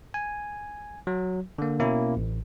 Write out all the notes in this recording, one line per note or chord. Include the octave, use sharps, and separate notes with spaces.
G#5
F#3
D3 A#3
B2 A#3 C#4 E4
A1